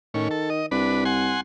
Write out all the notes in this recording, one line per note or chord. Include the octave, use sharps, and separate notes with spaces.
A2 D#3 C#4
A4
D#5
C2 D4 B4
F#5 G#5 C6